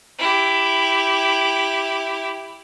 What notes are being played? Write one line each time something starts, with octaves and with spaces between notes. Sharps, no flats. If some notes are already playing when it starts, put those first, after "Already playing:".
E4 G4